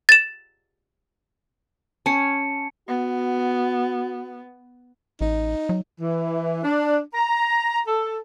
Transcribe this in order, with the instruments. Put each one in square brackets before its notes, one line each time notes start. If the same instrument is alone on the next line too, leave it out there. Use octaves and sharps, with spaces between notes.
[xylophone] A6 E7
[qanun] C#4 [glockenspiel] A5 C#7
[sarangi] B3 [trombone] F#4
[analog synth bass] A1 [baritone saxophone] D#4
[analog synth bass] F#3
[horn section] E3
D4
A#5
A4